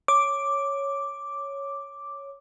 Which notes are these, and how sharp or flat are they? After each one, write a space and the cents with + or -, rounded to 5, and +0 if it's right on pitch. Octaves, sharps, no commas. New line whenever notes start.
C#5 +0 D6 +0